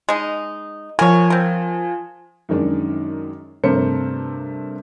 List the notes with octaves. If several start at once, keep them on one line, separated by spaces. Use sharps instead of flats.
G#3 D#4
F3 A#4 C#5 G#5
C4 A#4
F#2 D#3 G#3 D4
G2 C3 A3 A#4 C5 C#7